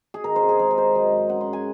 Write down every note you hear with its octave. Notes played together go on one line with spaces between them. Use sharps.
G#4
D#3 A#4
C5
C3
G#4
G#3 A#4
A#4
C4 C5
F#3 D#5
G#2
C#4 F#5
C6
G#2
G#5